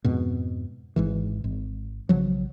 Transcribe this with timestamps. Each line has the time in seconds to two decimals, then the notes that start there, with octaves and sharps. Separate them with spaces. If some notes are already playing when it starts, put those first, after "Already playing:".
0.04 F2 G#2 B2
0.96 G#1 G#2 E3
1.44 G#1
2.09 B1 C#3 F3 F#3